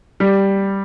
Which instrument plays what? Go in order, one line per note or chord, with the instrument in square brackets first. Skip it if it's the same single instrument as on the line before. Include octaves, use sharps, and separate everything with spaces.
[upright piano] G3